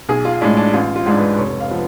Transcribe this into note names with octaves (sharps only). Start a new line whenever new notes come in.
B1 G#4
F4
A2 G#3 D4
D4
A1 F4
F4
G#2 G#3 D4
B4
B4
F1 C#5
F5
F3 B3